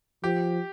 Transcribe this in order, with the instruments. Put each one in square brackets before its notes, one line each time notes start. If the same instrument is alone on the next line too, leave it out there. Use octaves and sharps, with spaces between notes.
[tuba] F3 [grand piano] G4